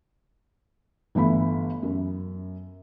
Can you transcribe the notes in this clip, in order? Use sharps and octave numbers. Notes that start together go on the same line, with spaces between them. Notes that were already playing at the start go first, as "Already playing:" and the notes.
G1 E3 A3 B5
F#2